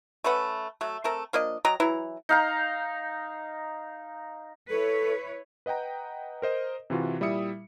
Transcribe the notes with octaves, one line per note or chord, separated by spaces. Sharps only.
A3 C#4 B4 F#5
F#3 A3
A3 C4 A#4 A5
F3 A#3 D4 D#5
F#3 D#5 G5 A#5
E3 F#3 E4 A#5
D#4 F5 A#5
E4 A4 B4 C#5
B4 D#5 F#5 G5 A#5
A#4 C5 D#5
C3 E3 F4 F#4
A#2 G3 E4 E5 D#6 C#7